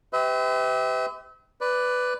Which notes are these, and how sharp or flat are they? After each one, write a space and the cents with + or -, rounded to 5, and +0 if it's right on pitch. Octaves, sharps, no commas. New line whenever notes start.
G4 +0 B4 +45 E5 -35
B4 +10 D5 +0